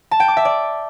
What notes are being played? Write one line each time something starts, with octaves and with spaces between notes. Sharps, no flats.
A5
G5
D6
E5
D5